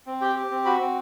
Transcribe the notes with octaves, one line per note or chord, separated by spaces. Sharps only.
C4
G4 G5
G4
C4
F#4 B5
C4